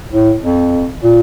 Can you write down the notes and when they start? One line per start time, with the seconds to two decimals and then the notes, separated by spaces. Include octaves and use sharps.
0.11 A2
0.42 F2
1.03 A#2